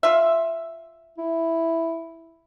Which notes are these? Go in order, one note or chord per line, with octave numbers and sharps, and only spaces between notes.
F4 E5
E4